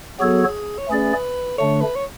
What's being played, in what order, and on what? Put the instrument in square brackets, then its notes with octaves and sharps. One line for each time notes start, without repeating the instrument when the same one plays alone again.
[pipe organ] F#3 B3 F#4 A4 C#5 [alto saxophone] G#4
[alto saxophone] C#5
[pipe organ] A3 C#4 G#4 D5 [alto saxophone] B4
[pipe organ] D3 A3 D4 [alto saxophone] C#5
[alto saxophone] B4
C#5